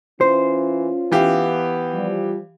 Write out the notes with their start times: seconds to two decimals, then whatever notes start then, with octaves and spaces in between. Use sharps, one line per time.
0.21 E3 C#4 F4 C5
1.12 E3 B3 G4 F5
1.93 F3 G3